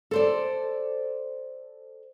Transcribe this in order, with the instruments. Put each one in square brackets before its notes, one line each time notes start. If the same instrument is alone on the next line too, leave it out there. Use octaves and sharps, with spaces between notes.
[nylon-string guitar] A4 C5 D5